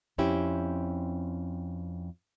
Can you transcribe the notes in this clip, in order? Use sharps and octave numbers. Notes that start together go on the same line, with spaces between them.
F2 C4 C#4 E4 G4 G5